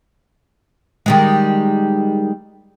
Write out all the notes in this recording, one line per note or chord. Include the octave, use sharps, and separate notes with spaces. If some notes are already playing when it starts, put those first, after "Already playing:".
D#3 G3 G#3